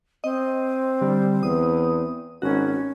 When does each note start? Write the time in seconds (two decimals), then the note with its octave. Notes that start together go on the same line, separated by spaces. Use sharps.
0.24 C4 D#5
1.01 D3 G3
1.43 E2 D#6
2.42 G#1 C#4 F#4